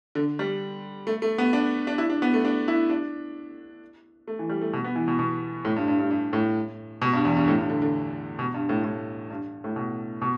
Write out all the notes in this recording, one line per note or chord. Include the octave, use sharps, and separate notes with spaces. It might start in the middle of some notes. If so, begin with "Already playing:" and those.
D3
G3
A3
A3
B3
D4
D4
E4
D4
B3
A3
D4
E4
D4
A3
E3
G3
A3
B2
B3
E3
B2
B2
A2
G2
G2
G2
G2
A2
B2
G2
E2
G2
A2
G2
D3
D3
B2
G2
A2
A2
G2
A2
B2
B2